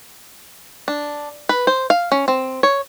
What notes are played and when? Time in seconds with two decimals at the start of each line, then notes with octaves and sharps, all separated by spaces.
0.88 D4
1.49 B4
1.67 C5
1.90 F5
2.12 C#4
2.28 C4
2.63 C#5